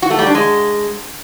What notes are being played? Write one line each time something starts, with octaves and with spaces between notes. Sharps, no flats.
F#4
A3
G3
D4
G#3